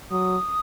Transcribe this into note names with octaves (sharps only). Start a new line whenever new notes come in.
F#3 D#6